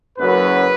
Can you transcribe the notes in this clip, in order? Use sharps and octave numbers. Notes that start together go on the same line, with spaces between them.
F#1 F#2 F#3 B4